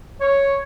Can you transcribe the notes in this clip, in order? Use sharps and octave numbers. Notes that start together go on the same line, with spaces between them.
C#5